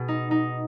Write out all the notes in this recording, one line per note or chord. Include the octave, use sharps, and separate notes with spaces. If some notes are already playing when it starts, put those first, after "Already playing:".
Already playing: B2 G#4
D#4
D#4